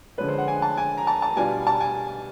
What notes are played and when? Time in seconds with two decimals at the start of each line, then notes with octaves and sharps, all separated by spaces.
0.18 D3 F3 G#3 C#4 B4
0.28 C5
0.38 F#5
0.48 G#5
0.62 A5
0.77 G#5
0.97 A#5
1.07 A5
1.22 A5
1.36 B2 G3 B3 D4 F4 G#5
1.67 A5
1.81 G#5